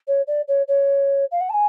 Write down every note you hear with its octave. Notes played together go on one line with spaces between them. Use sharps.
C#5
D5
C#5
C#5
F5
F#5
A5
G#5